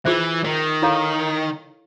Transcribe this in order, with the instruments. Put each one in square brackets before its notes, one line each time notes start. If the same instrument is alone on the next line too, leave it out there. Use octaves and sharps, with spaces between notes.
[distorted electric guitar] E3 [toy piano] F4 G#4 C5 E5
[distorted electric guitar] D#3
[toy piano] E4 A4 C#5 F5 A#5